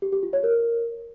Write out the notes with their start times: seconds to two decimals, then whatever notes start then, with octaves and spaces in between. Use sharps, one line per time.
0.02 G4
0.12 G4
0.23 F4
0.33 C#5
0.43 A#4